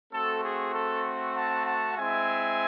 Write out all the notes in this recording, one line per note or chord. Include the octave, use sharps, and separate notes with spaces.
A3 C4 F#4 A4
G#4
A4
F#5 A5
F#5 A5
G#3 C4 E4 E5 G#5